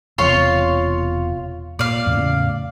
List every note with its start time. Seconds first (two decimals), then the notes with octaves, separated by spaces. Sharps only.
0.18 E1 E2 C3 F4 C#5 C6
1.79 A#2 D5 F5
2.06 E2 A2 C#3